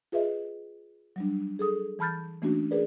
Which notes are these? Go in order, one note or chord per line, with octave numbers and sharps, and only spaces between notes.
F4 G#4 B4 D#5 E5
F#3 G3 D4
G#4 A4 D#6
E3 A5 B5 F6 G6 A6
E3 A3 A#3 C#4 D4 F#4
G#4 A#4 B4 D5